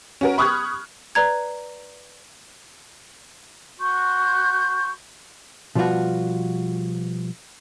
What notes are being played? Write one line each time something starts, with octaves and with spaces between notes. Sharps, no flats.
C#4 F#4 A#4
B5 C#6 D#6 F6 F#6 G#6
B4 D5 A#5 G#6
F#4 C6 C#6 G6
B2 F3 G3 B3 F4 F#4